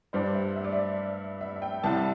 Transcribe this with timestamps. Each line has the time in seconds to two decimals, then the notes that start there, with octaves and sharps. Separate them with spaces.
0.13 G2 G3 D4 C5
0.35 E5
0.56 E5
0.64 D5
0.72 E5
1.41 E5
1.56 E5
1.62 G5
1.83 C2 C3 G3 E4 A5